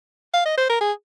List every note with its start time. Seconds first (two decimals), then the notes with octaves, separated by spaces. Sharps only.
0.34 F5
0.45 D#5
0.57 C5
0.70 A#4
0.81 G#4